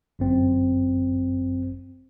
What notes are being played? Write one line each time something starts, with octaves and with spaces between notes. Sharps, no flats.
G1 F#2 C4